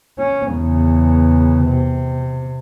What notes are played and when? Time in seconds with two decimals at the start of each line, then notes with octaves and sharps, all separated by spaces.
0.19 C#4
0.49 E2 C#3
1.66 C3